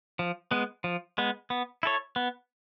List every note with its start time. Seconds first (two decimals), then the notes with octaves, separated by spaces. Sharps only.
0.19 F3
0.51 G#3 B3
0.84 F3
1.18 G#3 B3
1.50 B3
1.83 E4 A4 C#5
2.16 B3